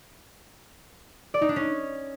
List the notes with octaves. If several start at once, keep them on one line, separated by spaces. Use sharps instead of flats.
D5
D#4
D4
C#4